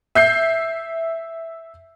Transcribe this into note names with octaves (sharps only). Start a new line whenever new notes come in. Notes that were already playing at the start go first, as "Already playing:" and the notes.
E5 G6 C7